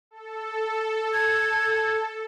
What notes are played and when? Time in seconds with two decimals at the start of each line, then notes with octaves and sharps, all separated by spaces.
0.11 A4
1.13 G#6